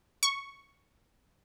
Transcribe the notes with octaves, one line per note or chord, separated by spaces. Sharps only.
C#6